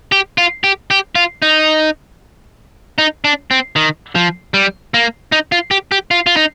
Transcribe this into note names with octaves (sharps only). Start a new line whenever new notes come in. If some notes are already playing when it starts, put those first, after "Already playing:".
G4
F4
G4
G4
F4
D#4
D#4
D4
C4
D#3
F3
G3
A#3
D#4
F4
G4
G4
F4
F4
D#4